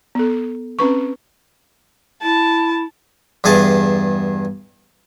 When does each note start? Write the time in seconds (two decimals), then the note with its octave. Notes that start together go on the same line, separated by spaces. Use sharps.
0.15 B3 A4
0.79 C4 C#4 B4 C#6
2.22 E4 A5
3.44 E2 G2 G#4 A5